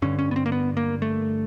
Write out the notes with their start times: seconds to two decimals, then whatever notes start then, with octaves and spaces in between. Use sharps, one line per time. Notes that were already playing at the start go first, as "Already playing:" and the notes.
0.02 G2 D3 C#4
0.19 C#4
0.31 B3
0.36 C4
0.46 A#3
0.52 B3
0.77 A#3
1.02 A3